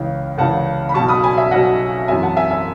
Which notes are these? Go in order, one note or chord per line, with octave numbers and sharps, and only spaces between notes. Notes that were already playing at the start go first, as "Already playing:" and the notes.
Already playing: C#2 C#3 E3
C#2 C#3 E3 F#5 A5
B5
B1 B2 F#3 A5 C#6
B5 D#6
G#5 B5
E5 G#5
B1 B2 F#3 D#5 F#5
G#1 F#2 E3 E5 G#5
F#5 A5
E5 G#5
E5 G#5